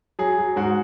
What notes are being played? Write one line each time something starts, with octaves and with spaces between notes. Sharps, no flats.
F#3 G#4
F#3
G#2 F#4